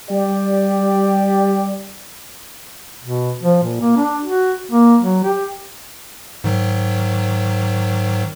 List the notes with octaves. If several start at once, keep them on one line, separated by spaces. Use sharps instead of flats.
G3 G4 D5
B2
F3
A#2
A#3
D4
F#4
A#3
F#3
G4
G#2 D#3 F#3